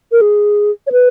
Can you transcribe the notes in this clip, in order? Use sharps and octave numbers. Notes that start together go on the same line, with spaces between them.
A#4
G#4
C#5
B4